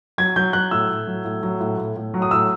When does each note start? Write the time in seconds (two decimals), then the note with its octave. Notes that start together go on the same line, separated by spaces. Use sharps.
0.18 F#3 G#6
0.36 F#3 G6
0.53 F#3 F#6
0.71 A2 E6
0.89 A2
1.07 F#3
1.25 A2
1.43 F#3
1.60 A2
1.78 A2
1.96 A2
2.14 F#3
2.22 D#6
2.31 A2 E6